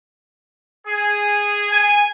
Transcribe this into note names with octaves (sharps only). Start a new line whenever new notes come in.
G#4
G#5